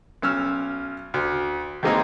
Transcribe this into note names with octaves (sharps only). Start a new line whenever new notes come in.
B1 C#4 E6 F6
D2
D#3 E3 G#3 A#3 C4 D#4